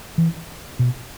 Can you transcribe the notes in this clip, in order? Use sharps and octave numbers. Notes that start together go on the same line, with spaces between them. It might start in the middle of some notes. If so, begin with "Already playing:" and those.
E3
B2